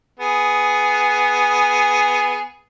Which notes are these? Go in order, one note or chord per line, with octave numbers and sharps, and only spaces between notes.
B3 G#4